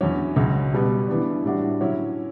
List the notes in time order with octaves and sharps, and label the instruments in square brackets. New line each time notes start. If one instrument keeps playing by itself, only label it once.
[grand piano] E2 D3 F#3 C#4
C#2 C#3 F#3 C#4
B2 G3 B3
E3 B3 D4
A2 G3 D4 F#4
D3 F#3 C#4 E4